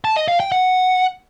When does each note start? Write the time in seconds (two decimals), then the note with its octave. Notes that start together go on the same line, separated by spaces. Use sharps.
0.05 A5
0.16 D#5
0.28 F5
0.40 G5
0.52 F#5